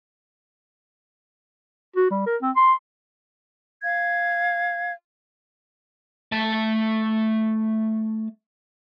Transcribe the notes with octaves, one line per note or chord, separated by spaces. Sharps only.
F#4
G3
A#4
C4
C6
F5 G#6
A3 A5